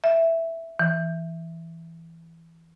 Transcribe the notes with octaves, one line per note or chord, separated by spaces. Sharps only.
E5
E3